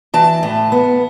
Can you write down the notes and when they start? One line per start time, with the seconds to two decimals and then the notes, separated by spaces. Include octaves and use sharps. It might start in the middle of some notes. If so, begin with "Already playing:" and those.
0.14 E3 A5
0.43 A2
0.72 B3